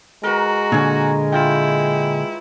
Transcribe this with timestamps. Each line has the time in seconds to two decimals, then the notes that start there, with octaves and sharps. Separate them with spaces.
0.23 G#3 F#4 A#4 B4 A#5
0.72 A#2 D3 C#5 G#5
1.32 E4 F4 G5